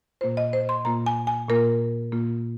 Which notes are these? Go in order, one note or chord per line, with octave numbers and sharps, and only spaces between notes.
A#2 A#3 F4 C5
D#5
C5
C6
A#2 A#3 F4 A#5
G#5
G#5
A#2 A#3 F4 A#4
A#2 A#3 F4